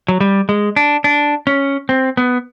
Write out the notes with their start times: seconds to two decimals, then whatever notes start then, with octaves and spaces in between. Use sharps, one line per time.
0.08 F#3
0.21 G3
0.49 G#3
0.76 D4
1.04 D4
1.47 C#4
1.89 C4
2.17 B3